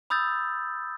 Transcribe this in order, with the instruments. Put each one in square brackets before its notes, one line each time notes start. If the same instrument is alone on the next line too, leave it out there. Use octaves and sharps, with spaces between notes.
[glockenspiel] B5 D#6 E6 G6 A6